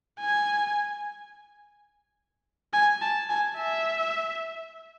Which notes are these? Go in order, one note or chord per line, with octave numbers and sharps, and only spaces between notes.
G#5
G#5
A5
G#5
E5